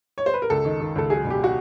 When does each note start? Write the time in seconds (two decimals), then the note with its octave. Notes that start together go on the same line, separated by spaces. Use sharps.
0.18 C#5
0.26 C5
0.34 B4
0.42 A#4
0.50 C#2 A4
0.65 D#3
0.80 D#3
0.95 C#2 A4
1.10 F#3 G#4
1.25 E1
1.30 G4
1.44 F#4